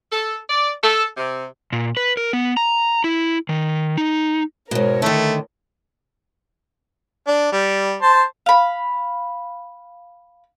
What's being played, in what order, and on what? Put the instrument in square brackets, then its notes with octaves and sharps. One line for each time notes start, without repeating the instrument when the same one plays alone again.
[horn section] A4
D5
A4
C3
[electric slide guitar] A#2
B4
A#4
B3
A#5
E4
D#3
D#4
[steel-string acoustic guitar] G#2 B2 [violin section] A#4 C#5
[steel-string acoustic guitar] D3 D#3 [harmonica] A3
[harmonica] D4
G3
C5 A5 C6
[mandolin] F5 B5